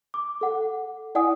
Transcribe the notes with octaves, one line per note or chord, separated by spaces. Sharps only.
D6
A4 F#5
E4 D5 F#5 G#5 D#6